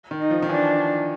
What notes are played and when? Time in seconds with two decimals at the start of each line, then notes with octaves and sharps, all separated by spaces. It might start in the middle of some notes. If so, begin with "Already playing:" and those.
0.11 D#3
0.21 D#4
0.31 F3
0.42 D#3
0.49 E3 D4